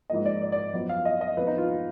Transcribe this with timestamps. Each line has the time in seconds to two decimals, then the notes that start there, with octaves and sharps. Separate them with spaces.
0.10 G#2 F3 A#3 D#5
0.25 D5
0.42 D5
0.52 D5
0.73 F#2 F3 B3
0.89 F5
1.05 D#5
1.21 D#5
1.37 F2 F3 B3 B4
1.47 D#4
1.58 F4
1.69 F4